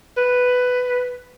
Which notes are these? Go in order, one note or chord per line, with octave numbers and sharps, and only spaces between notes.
B4